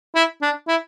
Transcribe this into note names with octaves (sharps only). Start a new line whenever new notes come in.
E4
D4
E4